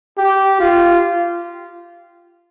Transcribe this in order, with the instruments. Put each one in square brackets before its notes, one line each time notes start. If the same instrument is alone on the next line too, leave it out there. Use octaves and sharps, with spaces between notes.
[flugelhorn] G4
F4